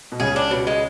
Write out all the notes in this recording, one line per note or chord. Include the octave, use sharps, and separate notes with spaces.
B2
C#2 C#3 G#4
D4
B2
G#3